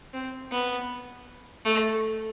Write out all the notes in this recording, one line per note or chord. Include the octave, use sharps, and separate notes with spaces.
C4
B3
A3